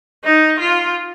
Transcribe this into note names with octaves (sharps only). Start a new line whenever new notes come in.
D#4
F4